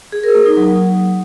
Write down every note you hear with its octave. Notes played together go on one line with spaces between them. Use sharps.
G#4
A#4
A#3
D#4
F#3